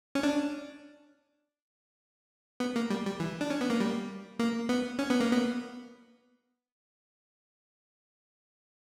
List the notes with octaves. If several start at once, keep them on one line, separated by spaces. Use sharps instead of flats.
C#4
D4
B3
A#3
G3
G3
E3
D4
C#4
B3
A#3
G3
A#3
B3
C#4
B3
A#3
B3